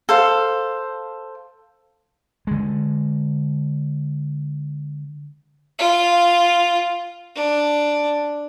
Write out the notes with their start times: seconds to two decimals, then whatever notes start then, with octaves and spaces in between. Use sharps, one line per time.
0.09 A4 C5 F5
2.47 D3 G#3
5.79 F4
7.36 D4